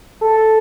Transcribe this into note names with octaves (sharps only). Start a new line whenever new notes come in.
A4